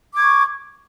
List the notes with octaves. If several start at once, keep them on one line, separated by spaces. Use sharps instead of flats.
C#6 D6 G#6